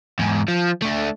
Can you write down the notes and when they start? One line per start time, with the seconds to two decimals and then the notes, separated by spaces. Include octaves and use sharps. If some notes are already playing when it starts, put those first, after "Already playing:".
0.19 E2 G#2
0.48 F3
0.82 A3 D4